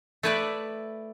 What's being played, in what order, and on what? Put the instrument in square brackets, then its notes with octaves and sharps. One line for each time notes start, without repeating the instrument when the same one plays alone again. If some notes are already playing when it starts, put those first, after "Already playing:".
[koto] A3 E4 B4 D5